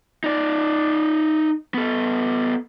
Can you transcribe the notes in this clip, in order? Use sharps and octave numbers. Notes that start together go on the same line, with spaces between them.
D#4 D5
B3 A4